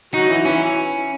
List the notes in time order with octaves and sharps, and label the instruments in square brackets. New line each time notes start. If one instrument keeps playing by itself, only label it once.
[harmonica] F#3 F#4 [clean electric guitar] D#4
[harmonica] E3 E4
[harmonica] E3 E4 [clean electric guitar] C#4